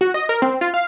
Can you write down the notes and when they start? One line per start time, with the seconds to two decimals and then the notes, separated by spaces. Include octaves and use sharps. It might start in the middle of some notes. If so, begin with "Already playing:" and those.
0.01 F#4
0.14 D#5
0.29 A#4
0.42 C4
0.61 F4
0.74 F5